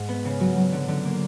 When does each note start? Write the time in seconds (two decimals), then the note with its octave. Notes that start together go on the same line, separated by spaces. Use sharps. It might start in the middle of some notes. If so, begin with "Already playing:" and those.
Already playing: G#2
0.08 B3
0.25 C#3
0.40 F#3
0.57 F#3
0.72 D3
0.88 D3
1.05 A#3